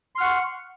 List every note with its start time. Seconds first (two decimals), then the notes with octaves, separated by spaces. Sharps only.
0.15 C6
0.18 F6
0.21 F#5
0.23 C#6